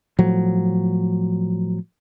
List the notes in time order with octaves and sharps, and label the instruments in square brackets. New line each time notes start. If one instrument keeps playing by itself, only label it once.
[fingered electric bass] A2 F3 F#3